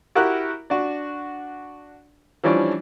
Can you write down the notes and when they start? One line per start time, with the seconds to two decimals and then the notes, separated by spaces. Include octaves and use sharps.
0.15 E4 F#4 G4 A#4 F#5 F#6
0.70 D4 F#4
2.44 E3 F3 G3 C#4 D4